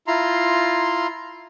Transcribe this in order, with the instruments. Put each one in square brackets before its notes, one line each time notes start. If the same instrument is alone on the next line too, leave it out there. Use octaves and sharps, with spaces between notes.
[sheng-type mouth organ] E4 F4 A#5 C6